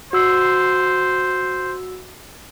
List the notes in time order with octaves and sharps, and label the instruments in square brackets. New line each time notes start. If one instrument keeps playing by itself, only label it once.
[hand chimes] F#4 E6 C7 [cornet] C5